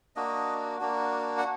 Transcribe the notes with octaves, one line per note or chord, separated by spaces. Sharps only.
A#3 D4 F#4 D#5
A#3 D4 F#4
F#5